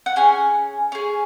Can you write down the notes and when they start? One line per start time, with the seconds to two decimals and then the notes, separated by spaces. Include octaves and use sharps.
0.06 F#5
0.16 C#4 G#4 G#5
0.92 C#4 G#4